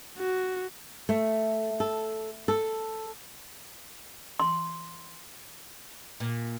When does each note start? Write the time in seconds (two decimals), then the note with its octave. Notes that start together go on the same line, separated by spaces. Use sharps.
0.18 F#4
1.09 A3
1.80 A4
2.48 A4
4.40 C6
6.20 A#2